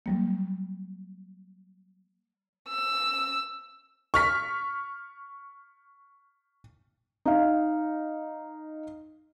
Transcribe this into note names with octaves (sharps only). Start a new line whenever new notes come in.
F#3 G3 A#3
E6
C#6 F6 B6
D#4 F5